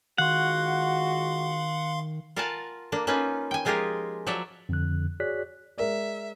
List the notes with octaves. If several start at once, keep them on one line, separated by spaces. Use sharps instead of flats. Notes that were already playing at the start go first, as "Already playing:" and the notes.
D#3 G#3 F4 F#4 F5 F#5 C6
F4 A#4 F5 F#5 G#5 A5
A#3 D4
A#3 C#4 D#4 F4 B4
G5 G#5
F3 G#3 F4 G4 G#4 A#4
F3 F#3 C#5 D5 E5
F2 D3 F#6
F#4 G#4 C#5 D5 F#6 B6
G#3 A#4 D5 E5